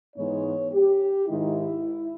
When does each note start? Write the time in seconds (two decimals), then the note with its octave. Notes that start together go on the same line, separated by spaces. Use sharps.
0.16 G#2 E3 G#3 B3 D#4 C#5
0.72 G4
1.27 G#2 D#3 G#3 D#4 E4